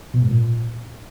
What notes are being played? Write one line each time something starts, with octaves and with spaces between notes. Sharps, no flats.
B2
G#2
A#2